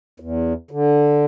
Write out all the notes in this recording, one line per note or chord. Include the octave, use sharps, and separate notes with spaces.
E2
D3